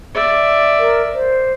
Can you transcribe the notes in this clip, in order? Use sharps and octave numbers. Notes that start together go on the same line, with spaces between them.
D5 E5
A#4
C5